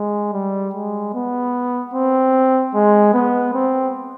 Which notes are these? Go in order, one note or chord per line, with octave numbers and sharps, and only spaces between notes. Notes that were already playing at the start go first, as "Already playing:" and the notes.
Already playing: G#3
G3
G#3
B3
C4
G#3
B3
C4